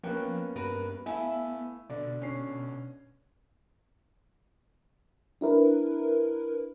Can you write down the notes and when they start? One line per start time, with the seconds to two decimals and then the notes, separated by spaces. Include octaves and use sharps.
0.03 F3 A#3 B3 C#4 F#4 G5
0.56 G2 F#4 A#4 B4
1.06 A3 B3 E4 E5 F5 G#5
1.90 B2 D3 D5
2.22 C#4 C7
5.41 D4 E4 A#4 B4